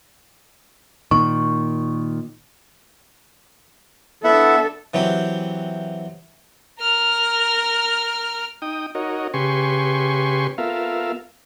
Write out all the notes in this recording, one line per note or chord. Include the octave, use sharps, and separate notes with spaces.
A#2 D#3 C#6
B3 D4 E4 A4 E5 F#5
E3 F#3 C4 G4
A#4 F6
D#4 G5 D#6
D#4 F#4 A#4 C#5 D#5
C#3 G4 B4 G#5 C6 C#6
B3 F4 A4 A#4 E5 F5